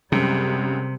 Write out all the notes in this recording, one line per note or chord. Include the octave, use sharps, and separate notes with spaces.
C#2 F#2 C3 G3